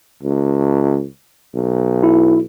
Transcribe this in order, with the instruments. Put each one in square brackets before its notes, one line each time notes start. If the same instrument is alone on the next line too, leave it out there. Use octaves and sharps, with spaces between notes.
[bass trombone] C#2
B1
[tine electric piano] E4